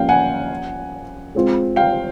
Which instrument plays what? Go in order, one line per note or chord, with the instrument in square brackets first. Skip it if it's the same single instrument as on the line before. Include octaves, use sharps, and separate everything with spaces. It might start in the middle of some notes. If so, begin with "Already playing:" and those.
Already playing: [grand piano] F3 A#3 C#4 [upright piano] F5 G5
[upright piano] F#5 G#5
[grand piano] G#3 C4 F4
[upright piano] F5 G5